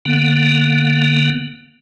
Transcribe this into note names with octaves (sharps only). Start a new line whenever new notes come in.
D3 A#3 B3